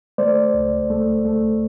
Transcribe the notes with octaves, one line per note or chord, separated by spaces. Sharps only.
A3 C5 D5
C#2
A3
A3